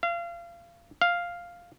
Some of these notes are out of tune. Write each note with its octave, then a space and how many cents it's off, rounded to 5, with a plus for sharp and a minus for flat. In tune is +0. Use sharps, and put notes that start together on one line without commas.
F5 -30
F5 +0